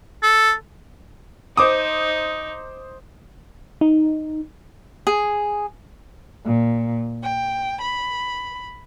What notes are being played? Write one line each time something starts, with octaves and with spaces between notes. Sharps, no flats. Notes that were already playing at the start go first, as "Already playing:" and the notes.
A4
D#4 C5 D6 D#6
D#4
G#4
A#2
G5
B5